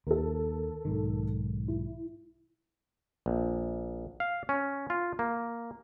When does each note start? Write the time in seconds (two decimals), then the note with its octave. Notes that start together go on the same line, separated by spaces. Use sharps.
0.07 D#2 A4 A#4
0.85 B1 G#2 D#3
1.68 E4
3.26 A#1
4.20 F5
4.49 C#4
4.90 F4
5.19 A#3